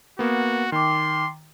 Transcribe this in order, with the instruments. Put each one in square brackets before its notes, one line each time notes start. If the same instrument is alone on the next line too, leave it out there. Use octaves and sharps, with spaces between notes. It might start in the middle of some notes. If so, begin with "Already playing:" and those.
[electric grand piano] A#3 B3 [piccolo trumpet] F#4
[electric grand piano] D#3 [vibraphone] G5 D6 [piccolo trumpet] C6